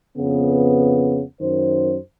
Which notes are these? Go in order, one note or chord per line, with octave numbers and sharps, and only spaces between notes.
F2 C#3 B3
F#2 D#3 C5